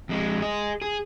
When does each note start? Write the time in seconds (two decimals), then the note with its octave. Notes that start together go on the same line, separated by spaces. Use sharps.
0.09 F2 G#3
0.42 G#4 D#5
0.82 G#4